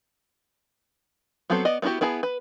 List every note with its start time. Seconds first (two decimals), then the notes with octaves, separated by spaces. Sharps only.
1.50 F#3 B3 C4 A4 C5
1.65 B3 D5 D#5
1.82 B3 C#4 E4 F#4 G4
2.01 B3 E4 G#4 A5 A#5
2.23 B4